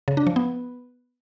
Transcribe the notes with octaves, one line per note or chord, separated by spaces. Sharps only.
C#3
D4
F3
B3